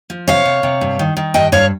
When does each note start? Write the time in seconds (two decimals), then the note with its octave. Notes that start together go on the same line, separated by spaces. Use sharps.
0.10 F3
0.28 C3 C#5 F5
0.45 C3
0.63 C3
0.81 G2
0.99 D#3
1.17 D#3
1.34 G2 D#5 G5
1.52 G2 C#5 F5